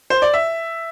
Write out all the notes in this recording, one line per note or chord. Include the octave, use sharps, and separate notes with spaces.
C5
D5
E5